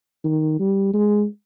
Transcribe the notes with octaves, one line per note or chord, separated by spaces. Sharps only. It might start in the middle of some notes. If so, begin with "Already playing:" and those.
D#3
G3
G#3